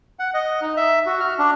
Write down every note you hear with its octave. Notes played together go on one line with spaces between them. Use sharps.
F#5
D#5
D#4
E5
F#4
F6
D4